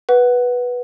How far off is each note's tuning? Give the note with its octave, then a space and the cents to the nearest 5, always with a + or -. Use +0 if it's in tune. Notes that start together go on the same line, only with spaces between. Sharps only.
B4 -10 F#5 +0